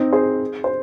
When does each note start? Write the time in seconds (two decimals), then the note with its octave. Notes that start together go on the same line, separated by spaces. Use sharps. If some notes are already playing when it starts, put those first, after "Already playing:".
Already playing: C4 D#4
0.12 G#4 C5
0.64 C5